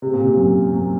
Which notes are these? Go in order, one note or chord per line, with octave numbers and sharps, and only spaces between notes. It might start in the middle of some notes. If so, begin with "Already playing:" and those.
C3
A#2
C3
F#2
F#2